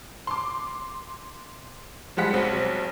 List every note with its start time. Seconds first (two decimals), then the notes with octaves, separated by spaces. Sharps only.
0.27 C6 D6
2.17 F3 G3 G#3 F#5 B6
2.33 B1 C4